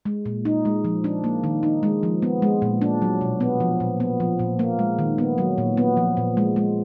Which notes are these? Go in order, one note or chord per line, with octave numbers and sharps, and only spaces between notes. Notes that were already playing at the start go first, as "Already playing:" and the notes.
G#3
A#2
D#4
G#3
F3
D4
A#3
D#3
D#4
G#3
F3
B3
G#3
A#2
D4
F#3
B2
B3
F3
A#2
B3
F3
A#2
A#3
G#3
D#3
B3
F#3
A#2
B3
F3
A#2
G#3
G#3